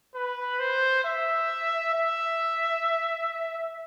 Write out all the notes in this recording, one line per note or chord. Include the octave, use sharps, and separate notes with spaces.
B4
C5
E5
E5